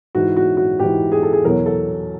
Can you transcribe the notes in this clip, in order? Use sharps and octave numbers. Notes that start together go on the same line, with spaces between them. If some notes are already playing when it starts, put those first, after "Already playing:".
G#2 E3 F#4
F#4
F#4
G#2 E3 G4
G#4
A4
G#4
E2 B2 F#3 A#4
A4